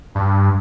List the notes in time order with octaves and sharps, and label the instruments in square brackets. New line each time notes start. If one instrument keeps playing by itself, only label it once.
[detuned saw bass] G2